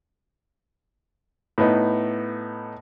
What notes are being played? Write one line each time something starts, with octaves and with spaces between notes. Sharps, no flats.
A2 B3 D#4